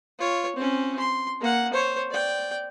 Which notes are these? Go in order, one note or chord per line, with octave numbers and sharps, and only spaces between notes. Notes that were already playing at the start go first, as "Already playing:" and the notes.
F4 C#5
C4 C#4
C6
A#3 F#5
C5 C#5
D5 G5